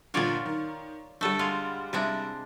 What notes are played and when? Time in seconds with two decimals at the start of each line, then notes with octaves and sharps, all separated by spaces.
0.14 G1 A#2 D3 F4 C#5 D5
0.46 D#3
1.21 D3 G3 A3 A4
1.39 G#3 F4
1.93 C3 G3 G#3 D4 E4